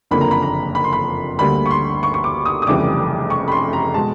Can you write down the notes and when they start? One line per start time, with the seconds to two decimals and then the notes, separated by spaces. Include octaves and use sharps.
0.11 F#1 F2 D3 F3 A#3 B5
0.21 A#5
0.31 B5
0.43 A#5
0.75 B5
0.84 C6
0.93 B5
1.39 D2 D3 G3 A#3 B5
1.66 C#6
1.71 C6
2.03 C#6
2.14 C#6
2.24 D6
2.46 D#6
2.62 D#6
2.67 F1 F2 C#3 E3 G3 D6
3.30 C#6
3.48 B5
3.52 C6
3.73 A#5
3.94 B2 G#3 A5